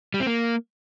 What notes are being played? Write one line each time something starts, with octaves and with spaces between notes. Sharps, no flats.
G3
C4
A#3